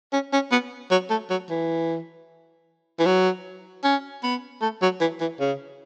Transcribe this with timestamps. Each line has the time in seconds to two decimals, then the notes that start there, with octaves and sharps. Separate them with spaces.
0.13 C#4
0.33 C#4
0.52 B3
0.91 F#3
1.10 A3
1.30 F#3
1.50 E3
2.99 E3
3.06 F#3
3.84 C#4
4.23 B3
4.62 A3
4.82 F#3
5.01 E3
5.20 E3
5.40 C#3